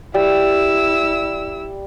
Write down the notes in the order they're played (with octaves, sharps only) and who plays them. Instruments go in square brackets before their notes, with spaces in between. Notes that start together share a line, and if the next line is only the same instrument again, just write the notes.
[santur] G3 [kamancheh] E4 E6